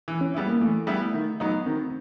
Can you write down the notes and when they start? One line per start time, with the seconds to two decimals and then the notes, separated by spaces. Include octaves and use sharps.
0.08 E3
0.21 C#4
0.34 G3 B3 E4
0.48 A#3
0.61 E3 A3
0.87 G3 B3 E4
1.14 D#3
1.40 F#3 B3 D#4
1.66 D#3 C4